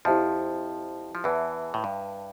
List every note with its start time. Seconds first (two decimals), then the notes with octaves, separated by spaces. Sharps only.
0.05 F2 F3 E4 G4 C5 E5 A5
1.15 F3
1.24 E2 E3 B4 E5 A5
1.74 A2
1.84 G2